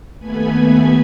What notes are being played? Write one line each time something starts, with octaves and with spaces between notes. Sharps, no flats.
D#2 A3 B3 G#5 B5 G#6